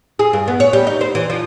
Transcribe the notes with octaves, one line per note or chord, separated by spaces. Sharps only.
G#4
G2
B3
C#5
G3
D#4
C5
E3
F3